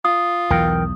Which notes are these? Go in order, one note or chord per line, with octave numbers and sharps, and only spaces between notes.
F4 D#6
B1 E2 E3 A#4 G5